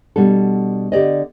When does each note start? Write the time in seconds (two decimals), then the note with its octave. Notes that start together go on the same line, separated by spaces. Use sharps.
0.16 B2 G3 D4 A4
0.92 D3 G4 D5 D#5